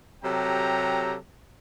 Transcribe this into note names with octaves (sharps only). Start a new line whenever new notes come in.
C3 F#3 G4 A4 G5 A#5